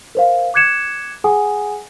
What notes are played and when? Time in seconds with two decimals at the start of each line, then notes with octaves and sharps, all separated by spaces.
0.15 A#4 C5 F5
0.54 D6 F#6 G#6 C#7 E7
1.24 G#4 F#5 G#5 D#6